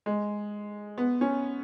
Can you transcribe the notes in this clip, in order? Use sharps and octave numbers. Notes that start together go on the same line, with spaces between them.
G#3
B3
C#4